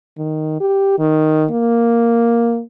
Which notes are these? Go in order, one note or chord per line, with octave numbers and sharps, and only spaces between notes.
D#3
G4
D#3
A#3